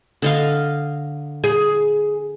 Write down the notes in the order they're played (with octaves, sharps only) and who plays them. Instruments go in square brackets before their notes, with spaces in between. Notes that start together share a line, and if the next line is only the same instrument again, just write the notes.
[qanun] D3 D#5 F5
[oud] G#4